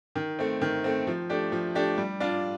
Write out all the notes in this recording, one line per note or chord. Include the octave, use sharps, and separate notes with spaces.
D#3
A3 C4
D#3
A3 C4
F3
A3 D4 G4
F3
A3 D4 G4
G3
D4 F4